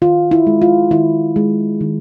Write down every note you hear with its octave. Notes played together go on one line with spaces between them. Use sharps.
D#3 F4
E4
G#3
F4
D#3 E4
G#3
D#3